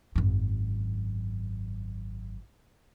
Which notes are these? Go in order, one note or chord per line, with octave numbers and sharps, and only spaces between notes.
G#1 F#2